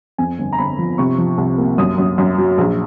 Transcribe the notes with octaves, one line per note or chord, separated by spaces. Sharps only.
F2 G#5
G1
A#5
G1 B5
F3
C3 C#6
F3
C2
A#3
F#2 D#6
F#2
F#2
F#3
A#1